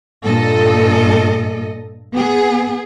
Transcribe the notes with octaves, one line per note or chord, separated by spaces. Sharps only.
G2 A#2 A4 D#5
B3 G#4